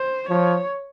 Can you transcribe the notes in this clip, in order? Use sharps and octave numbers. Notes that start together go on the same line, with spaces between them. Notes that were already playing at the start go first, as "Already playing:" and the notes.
Already playing: C5
F3 C#5